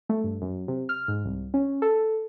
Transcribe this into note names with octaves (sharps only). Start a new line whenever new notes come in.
A3
G2
F#2
C3
F6
G#2
C2
C#4
A4